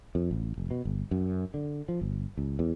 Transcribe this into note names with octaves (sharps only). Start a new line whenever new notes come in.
F2
A1
F1
B2
G1
F#2
D3
F3
G1
C#2
E2